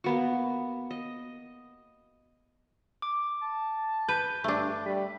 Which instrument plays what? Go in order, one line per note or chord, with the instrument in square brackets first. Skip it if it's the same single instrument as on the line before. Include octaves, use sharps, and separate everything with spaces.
[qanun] A#3 B3 F#4
D#5
[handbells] D6
[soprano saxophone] A5
[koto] B4 [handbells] G6
[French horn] G2 [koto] A3 D4
[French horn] G3 [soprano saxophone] B5